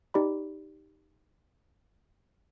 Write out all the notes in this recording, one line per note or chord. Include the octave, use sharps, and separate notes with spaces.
D#4 G4 D5 B5